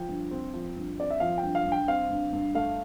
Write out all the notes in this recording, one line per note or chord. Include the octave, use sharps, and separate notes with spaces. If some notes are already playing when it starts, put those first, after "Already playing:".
Already playing: F3 G5
G2
C4
F3
G2
C4 D5
E5
F3 F5
G5
G2
F5
G2
G5
C4 F5
G2
G2
A3 F5